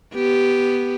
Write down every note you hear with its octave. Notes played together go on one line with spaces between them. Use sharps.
B3 G4